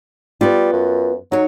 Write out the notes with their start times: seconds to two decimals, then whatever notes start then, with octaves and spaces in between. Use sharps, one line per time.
0.41 G3 B3 F4
0.73 F#2
1.32 F#3 D#4 C#5